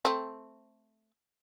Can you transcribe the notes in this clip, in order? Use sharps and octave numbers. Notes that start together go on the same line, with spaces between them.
A3 C4